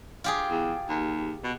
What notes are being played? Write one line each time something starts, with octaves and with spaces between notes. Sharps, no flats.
F4 G4 G#4
E2
D#2
B2